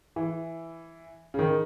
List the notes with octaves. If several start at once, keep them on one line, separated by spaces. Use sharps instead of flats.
E3
C#3
D#3